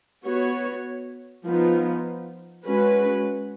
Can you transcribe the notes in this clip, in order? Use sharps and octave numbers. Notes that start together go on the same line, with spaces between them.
B3 F#4 C#5
F3 B3 D#4
G#3 C#4 F#4 B4